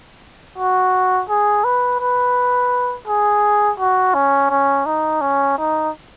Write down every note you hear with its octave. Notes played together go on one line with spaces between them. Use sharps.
F#4
G#4
B4
B4
G#4
F#4
C#4
C#4
D#4
C#4
D#4